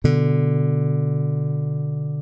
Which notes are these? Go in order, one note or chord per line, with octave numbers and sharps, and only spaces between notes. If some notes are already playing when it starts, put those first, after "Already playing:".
B2 D3